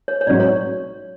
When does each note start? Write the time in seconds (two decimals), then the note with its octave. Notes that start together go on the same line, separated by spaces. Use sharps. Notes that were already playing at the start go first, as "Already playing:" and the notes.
0.08 C#5
0.21 C#5
0.27 A1 G#2 F#3 C#4 F#4 D5
0.40 C#5